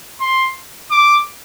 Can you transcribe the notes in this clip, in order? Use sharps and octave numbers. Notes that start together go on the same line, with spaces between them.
C6
D6